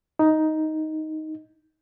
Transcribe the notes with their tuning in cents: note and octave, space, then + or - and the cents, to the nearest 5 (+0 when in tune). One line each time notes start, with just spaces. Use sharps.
D#4 +5